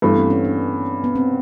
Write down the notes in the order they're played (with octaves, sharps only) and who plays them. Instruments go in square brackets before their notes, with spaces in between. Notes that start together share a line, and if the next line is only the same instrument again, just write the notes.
[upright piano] G2 E3 A3 [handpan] B3
[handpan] C4
C#4
D4
B3
C4